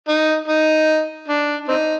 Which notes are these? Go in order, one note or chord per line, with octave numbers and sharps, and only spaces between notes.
D#4
D#4
D4
C4 D#4